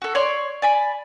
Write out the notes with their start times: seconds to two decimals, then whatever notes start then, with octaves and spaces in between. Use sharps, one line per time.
0.02 F#4 A4
0.15 C#5 D5 C6
0.62 D5 G#5 B5